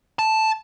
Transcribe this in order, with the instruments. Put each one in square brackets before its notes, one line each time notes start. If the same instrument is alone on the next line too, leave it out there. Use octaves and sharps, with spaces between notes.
[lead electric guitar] A5